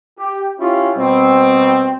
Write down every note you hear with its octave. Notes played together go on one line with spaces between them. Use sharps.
G4
C#4 E4 F4 G4
B2 G3 C4